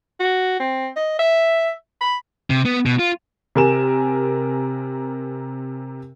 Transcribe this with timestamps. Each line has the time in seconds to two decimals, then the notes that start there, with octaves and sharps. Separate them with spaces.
0.20 F#4
0.59 C4
0.96 D#5
1.19 E5
2.01 B5
2.50 C3
2.66 B3
2.86 B2
2.99 F4
3.55 C3 A#4 G#5 E7